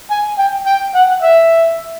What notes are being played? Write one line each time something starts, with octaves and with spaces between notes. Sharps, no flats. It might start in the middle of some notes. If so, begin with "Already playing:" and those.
G#5
G5
G5
F#5
E5